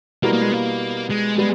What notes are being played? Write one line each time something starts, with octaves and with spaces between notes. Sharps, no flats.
B2 G3 A#3 B3 E4 A#4
A#3
G#3
A#3
G#3
G3 G#3 B3